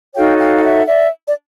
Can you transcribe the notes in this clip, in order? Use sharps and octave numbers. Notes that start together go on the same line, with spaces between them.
D#4 F#4 A4 C#5 F5 G5
F5 G5
G5
E5 F#5
D5 E5
D5